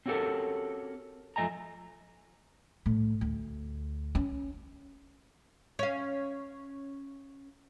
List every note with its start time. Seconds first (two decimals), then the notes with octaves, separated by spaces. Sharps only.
0.06 C4 C#4 F#4 G4 A4 A#4
1.36 F#2 F3 A3 D#5 G#5 A#5
2.86 A2
3.21 D2
4.15 C#4
5.79 C#4 F5